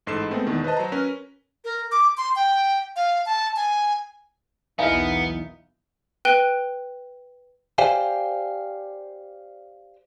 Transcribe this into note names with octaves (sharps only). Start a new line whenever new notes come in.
A1 G#2 A4 C7 E7
G#3 A3 B3 C4
E2 B2 D#3
B4 C5 D#5 A5
F#3 C5 A#5
C#4 A#4 B4
A#4
D6
C6
G5
F5
A5
G#5
B1 E2 B3 D#4 E4 A#4 F5 G#5
B4 G5 F#6 D#7 G7
G4 C5 D5 F5 G5 G#5